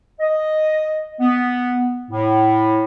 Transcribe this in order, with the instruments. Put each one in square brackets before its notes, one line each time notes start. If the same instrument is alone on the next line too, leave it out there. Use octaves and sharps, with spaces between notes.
[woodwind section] D#5
B3
A2